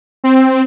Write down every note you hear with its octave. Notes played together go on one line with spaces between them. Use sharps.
C4